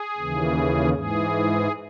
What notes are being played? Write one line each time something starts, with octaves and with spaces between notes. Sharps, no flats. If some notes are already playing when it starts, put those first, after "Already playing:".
Already playing: G#4
D#2 C#3 E3
G#2 E3 G#4